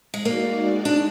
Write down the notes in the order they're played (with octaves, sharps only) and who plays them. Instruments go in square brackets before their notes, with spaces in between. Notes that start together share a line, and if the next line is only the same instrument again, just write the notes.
[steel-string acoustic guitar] G#3
[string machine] G#3 D#4 F#4 D5 [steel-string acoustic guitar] A#3
[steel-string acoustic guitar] D4